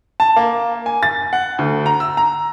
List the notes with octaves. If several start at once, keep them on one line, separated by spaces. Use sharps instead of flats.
A5
A#3
G#5
A6
F#5
D2
A#5
E6
A#5